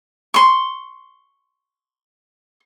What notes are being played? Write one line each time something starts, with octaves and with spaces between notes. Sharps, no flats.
C6 C#6